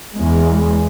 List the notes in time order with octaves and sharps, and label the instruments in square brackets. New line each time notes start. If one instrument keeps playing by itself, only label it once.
[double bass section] E2 G#3